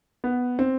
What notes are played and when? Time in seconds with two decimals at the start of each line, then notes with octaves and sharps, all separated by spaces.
0.24 B3
0.59 C4